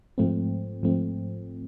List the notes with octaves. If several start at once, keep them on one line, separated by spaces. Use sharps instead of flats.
G#2 F3 A3 C4
G#2 F3 A3 C4